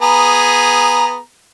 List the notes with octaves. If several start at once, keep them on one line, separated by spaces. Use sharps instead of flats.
B3 G#4 A#5